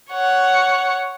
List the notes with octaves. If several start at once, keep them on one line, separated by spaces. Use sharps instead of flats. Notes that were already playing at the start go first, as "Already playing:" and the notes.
C#5 F#5